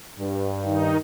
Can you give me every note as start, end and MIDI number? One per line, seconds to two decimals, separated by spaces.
0.18 0.95 43
0.64 0.97 51
0.64 0.97 63